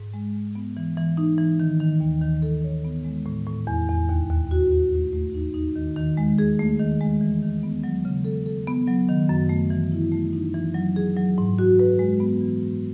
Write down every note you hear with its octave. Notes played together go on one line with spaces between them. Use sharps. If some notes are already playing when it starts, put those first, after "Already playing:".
Already playing: G#2
G#3
G#3
B3
E3
E3
D#4
E3
D#3
D#3
D#2
D#3
A4
C#5
B3
G#3
A2
A2
E2
E2
D#2
D#2
F#4
F#4
A3
A3
D#4
D#4
D#3
D#3
G#3
G#4
A3
D#3
G#3
E3
D#3
B3
F#3
C#3
A4
A4
B3
F#3
D#3
F#2
A3
E3
E4
A3
D#4
E3
F#3
G#4
F#3
G#2
F#4
B4
G#3
B3
E3
G#2